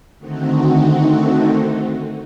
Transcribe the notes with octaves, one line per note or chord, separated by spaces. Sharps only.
D3 D#3 A3 C4 D#4 F#4